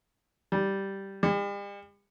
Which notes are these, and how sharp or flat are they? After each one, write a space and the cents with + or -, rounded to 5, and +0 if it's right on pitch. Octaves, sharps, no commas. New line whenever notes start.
G3 -5
G3 +45